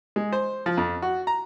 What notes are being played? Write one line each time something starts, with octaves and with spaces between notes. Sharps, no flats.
G#3
C5
F3
F2
F#4
A#5